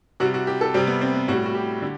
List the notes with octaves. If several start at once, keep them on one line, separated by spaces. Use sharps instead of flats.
C3 G3 F#4
F#4
G4
A4
C3 G3 C4
B3
C4
B3
A2 G3 F#4
F#4
G4
D3